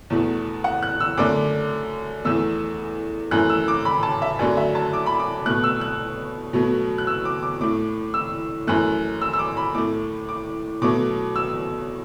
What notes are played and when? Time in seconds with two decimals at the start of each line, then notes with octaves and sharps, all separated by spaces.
0.10 E2 B2 A3
0.64 F#5
0.83 F#6
1.00 E6
1.17 F#2 D3 A3 D6
2.25 E2 E3 A3 E6
3.31 F#2 E3 A3 F#6
3.50 E6
3.68 D6
3.85 B5
4.03 A5
4.22 E5
4.39 F#2 D3 F#3 A3 D5
4.57 E5
4.75 A5
4.93 D6
5.06 B5
5.19 D6
5.46 B2 A3 F#6
5.64 E6
5.81 F#6
6.53 B2 F#3 A3
6.98 F#6
7.07 E6
7.25 D6
7.43 D6
7.61 A2 A3 D6
8.14 E6
8.67 F#2 E3 A3 F#6
9.21 E6
9.34 E6
9.39 D6
9.57 B5
9.75 A2 A3 D6
10.29 D6
10.82 B2 F#3 A3 D6
11.36 E6